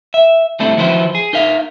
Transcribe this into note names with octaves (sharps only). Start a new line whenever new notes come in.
E5
G3 A3 C4 D4 E4 A4
D#3 F3 F#3 E4 B4 C5
G#4
D#4 A#4 E5 F5